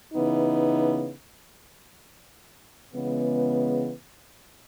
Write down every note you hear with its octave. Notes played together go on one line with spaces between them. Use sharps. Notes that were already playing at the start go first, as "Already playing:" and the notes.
C#3 E3 B3 D#4
C#3 E3 G#3 B3